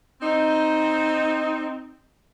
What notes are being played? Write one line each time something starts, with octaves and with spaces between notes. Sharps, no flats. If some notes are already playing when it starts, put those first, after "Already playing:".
C4 D#4